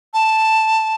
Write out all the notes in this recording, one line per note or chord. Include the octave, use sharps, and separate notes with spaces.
A5